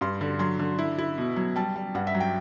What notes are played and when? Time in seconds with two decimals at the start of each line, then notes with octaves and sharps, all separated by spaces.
0.01 G2 C6
0.21 D3
0.39 F#3 C6
0.59 D3
0.79 E4
0.98 E4
1.18 B2
1.36 F#3
1.56 G3 A5
1.76 G3
1.95 G2 F#5
2.07 E5
2.15 F#3
2.20 G5